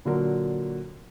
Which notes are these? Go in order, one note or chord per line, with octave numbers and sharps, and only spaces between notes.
A#2 D3 F#3 A#4